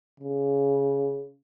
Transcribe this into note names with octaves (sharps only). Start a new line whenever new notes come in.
C#3